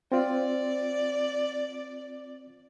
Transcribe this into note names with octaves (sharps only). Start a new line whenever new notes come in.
C4 F4 D5